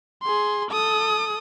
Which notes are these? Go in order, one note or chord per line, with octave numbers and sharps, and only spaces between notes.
G#4 C6
A4 D#6